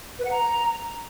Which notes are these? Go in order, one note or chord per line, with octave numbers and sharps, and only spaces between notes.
B4
F#5
A#5